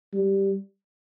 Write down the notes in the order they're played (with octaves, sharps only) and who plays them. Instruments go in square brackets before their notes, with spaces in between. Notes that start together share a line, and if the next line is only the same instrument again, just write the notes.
[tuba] G3